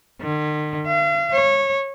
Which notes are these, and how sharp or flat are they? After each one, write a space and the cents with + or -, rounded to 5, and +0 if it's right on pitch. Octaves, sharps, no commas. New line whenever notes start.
D#3 -45
F5 -40
C#5 -20